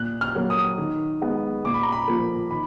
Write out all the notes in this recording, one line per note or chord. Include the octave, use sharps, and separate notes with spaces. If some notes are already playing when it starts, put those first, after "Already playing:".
Already playing: A#2 F#6
F6
F#3 A#3
D#6
D#3
G#3 B3
A#2 D6
B5
A#5
B5
F3 A#3
D#3 B5